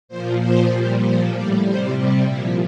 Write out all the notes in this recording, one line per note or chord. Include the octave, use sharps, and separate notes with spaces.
A#2 F3 C5
A#2 F3 C5
A#2 G3
A#2 F3 C5
A2 G3 D5
C3 G3 C5
C3 G3 G4
A#2 F3 E4